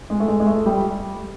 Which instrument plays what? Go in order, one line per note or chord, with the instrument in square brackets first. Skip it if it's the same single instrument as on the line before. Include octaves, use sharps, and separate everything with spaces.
[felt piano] G#3
A3
G#3
G#3
A3
G3